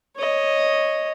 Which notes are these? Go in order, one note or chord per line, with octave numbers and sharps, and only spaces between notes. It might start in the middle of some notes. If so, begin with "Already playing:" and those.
C#5 D#5